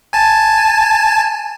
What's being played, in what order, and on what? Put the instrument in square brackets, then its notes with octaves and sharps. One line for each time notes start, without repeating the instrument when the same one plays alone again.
[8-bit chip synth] G#5 A5